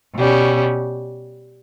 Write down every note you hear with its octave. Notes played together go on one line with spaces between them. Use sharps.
B2 G3 C#4